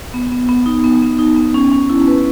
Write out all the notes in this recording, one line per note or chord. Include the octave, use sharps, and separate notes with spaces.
B3
B3
B3
D#4
B3
B3
D#4
B3
C#4
C#4
E4
B4